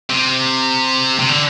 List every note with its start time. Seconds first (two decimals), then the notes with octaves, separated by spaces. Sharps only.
0.10 C3
1.19 C3
1.29 D3